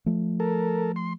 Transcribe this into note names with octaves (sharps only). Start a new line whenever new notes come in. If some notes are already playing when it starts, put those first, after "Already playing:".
F3 A3
A4 A#4
C6